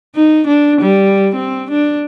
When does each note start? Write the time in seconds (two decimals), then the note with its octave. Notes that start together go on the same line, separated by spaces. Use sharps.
0.15 D#4
0.47 D4
0.81 G3
1.35 C4
1.71 D4